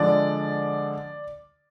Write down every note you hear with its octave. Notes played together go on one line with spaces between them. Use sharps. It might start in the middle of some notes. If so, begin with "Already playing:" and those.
Already playing: D3 F3 G#3 D5